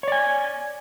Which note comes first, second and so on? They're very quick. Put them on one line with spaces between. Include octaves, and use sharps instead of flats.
C#5 D5 G#5